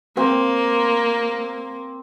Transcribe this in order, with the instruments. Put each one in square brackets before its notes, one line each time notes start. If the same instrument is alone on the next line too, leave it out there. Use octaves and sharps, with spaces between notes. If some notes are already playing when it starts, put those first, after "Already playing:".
[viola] A#3 [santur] C4